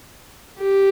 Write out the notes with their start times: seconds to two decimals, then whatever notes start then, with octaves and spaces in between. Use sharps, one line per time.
0.61 G4